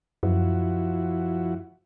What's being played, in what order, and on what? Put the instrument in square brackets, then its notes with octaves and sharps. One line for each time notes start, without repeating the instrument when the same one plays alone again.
[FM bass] F#2 [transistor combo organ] F3 E4 F#4